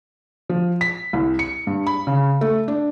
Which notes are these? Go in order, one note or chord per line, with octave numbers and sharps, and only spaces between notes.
F3
B6
C2
C#7
G2
B5
C#3
A3
D4